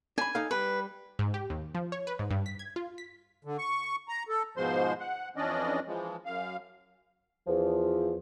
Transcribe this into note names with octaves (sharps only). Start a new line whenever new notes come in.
D4 G#5 B5
D#4 A4 F5
G3 B4
G#2
G4
D#2
F3
C#5
B4
G#2
G2
B6
G#6
F4
B6
D3
C#6
A#5
A4
G#2 B2 F3 G#3 C5 C6
F#5
F2 E3 C#4 D4 D5 D#5
E3 F3 G#3
F#2 F5
E2 F3